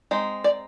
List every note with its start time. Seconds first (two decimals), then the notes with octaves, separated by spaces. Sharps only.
0.11 G#3 C4 D#4
0.44 D5